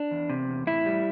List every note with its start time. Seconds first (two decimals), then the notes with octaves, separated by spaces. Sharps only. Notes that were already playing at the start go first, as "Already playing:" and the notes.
Already playing: D4
0.11 E2
0.30 C3
0.49 E2
0.67 A2 E4
0.86 G3